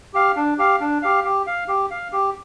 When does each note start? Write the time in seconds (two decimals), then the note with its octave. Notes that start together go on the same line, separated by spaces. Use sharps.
0.14 G4 F5
0.36 D4
0.58 G4 F5
0.81 D4
1.02 G4 F5
1.25 G4
1.46 F5
1.68 G4
1.91 F5
2.12 G4